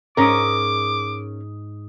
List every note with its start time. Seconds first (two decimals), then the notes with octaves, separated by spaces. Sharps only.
0.17 G#2 C#4 A#4 D6 D#6